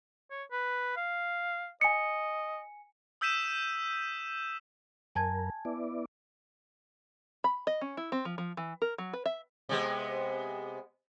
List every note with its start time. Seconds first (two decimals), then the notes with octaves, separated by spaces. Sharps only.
0.31 C#5
0.51 B4
0.96 F5
1.81 D#5 G#5 C#7
3.21 D#6 E6 G6 B6 D#7 E7
5.15 F#2 A#4 G#5 A5 G#6
5.65 B3 E4 D5
7.44 B5
7.67 D#5
7.81 C#4
7.97 E4
8.12 C4
8.25 F3
8.38 F3
8.57 E3
8.82 A#4
8.98 F#3
9.13 B4
9.26 E5
9.69 C3 G#3 B3